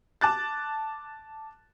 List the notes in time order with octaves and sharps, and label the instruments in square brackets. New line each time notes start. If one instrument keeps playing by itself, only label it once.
[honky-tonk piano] A5 D6 F#6 A6